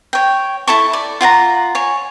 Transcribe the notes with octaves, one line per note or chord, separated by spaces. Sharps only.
C#5 G5
E4 A4 A5 C#6
D5
F4 F#5 G#5 A#5
C#5 G#5